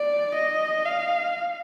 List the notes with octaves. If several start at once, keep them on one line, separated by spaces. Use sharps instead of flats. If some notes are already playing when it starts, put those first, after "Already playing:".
Already playing: D5
D#5
F5